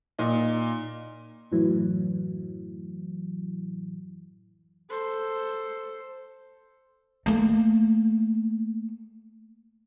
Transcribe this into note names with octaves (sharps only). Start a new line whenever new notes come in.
A#2 D#4
F#2 A2 E3 F#3
A4 C5
A3 A#3